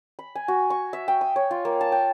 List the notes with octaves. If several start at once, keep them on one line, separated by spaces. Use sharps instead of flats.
B5
G#5
F#4
C#6
E5
G5
D#6
C#5
F4
A#3
A5
G5